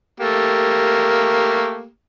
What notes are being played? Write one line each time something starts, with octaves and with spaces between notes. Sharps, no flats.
A3 A#3 G4